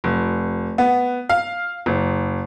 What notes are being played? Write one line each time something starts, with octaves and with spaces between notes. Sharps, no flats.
F1
B3
F5
F#1